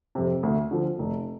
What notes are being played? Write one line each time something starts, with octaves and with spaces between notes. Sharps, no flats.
F2 C3
D2
D3 F3
F1